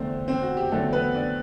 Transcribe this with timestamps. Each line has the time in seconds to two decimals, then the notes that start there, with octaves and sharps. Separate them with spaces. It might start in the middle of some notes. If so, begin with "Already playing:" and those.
Already playing: E2 D3 A3 C4 C5
0.28 C4 C5
0.42 F#4
0.57 G4
0.71 E2 D3 F#3 A3 C4 A4
0.93 B3 B4
1.15 D4 D5